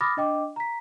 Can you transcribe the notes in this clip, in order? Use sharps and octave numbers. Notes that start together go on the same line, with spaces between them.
B5 D6 D#6 F6 A6 A#6
D4 D#5 G5 D6
A#5 B6